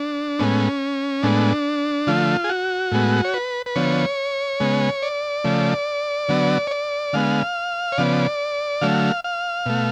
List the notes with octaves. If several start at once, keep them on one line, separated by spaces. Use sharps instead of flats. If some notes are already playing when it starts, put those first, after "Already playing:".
Already playing: D4
A2 G#3 B3 C#4
A2 G#3 B3 D4
D3 F3 A3 F4
G#4
F#4
A2 G#3 B3
C#5
B4
B4
D3 F3 B3 C#5
C#3 G#3 B3
D5
C#3 F3 A3
D3 F#3 B3
C#5
D5
D3 G#3 B3 F5
C#5
C#3 F3 B3 D5
D3 F#3 A3 F5
F5
B2 A3